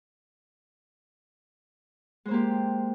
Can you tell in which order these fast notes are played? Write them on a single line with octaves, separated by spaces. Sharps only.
G#3 C5 A#3 G4